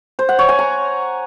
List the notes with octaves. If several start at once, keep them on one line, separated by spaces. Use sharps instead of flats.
C5
F#5
C#5
G#5
A#5